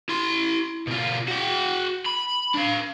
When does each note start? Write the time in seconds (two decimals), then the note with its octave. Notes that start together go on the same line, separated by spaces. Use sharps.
0.09 E4 C6
0.87 B2 F4
1.28 F#4 G5
2.06 B5
2.54 D4 F5